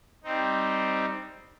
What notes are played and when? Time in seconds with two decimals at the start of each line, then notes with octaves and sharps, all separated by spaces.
0.24 G3 C4 D#4